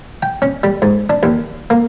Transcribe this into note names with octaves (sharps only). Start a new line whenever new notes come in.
G5
C#4
G3
G#2
D4
D#2
A#3